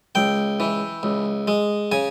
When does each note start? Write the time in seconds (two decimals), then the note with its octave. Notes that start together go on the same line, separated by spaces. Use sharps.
0.15 C#2 G5
0.60 E3
1.03 C#2
1.48 G#3
1.92 C#3 G#5